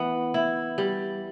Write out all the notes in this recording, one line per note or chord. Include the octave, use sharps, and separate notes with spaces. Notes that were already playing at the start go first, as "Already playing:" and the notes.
Already playing: E3 B3
E4
G3